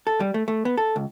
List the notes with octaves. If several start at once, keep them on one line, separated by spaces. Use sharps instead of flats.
A4
G3
A3
A3
B3
A4
C#2